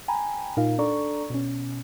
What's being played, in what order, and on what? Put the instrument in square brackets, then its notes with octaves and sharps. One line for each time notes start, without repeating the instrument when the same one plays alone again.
[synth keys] G5 G#5 A#5 B5
A#2 D#4 F4 A#4 F5
D4 A4 D5 A#5 C#6
B2 C#4